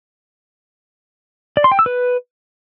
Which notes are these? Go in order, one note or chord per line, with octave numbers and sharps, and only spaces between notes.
D5
C6
G5
E6
B4